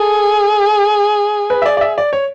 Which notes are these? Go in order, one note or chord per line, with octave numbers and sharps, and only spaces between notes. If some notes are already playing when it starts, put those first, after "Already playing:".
Already playing: G#4 A4
B4
E5
D5
D5
E5
D5
C#5